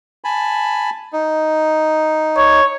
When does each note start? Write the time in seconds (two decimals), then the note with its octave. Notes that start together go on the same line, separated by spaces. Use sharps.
0.24 G#5 A5 B5
1.13 D#4
2.37 C#5